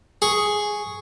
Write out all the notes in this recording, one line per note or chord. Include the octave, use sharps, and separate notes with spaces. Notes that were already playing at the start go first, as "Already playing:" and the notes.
G#4 C#6